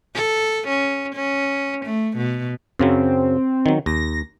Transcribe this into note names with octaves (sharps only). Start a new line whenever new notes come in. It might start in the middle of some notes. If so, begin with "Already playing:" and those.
A4
C#4
C#4
A3
B2
F#2 C#3 F#3 C4
D#3 F#3
D#2 A#6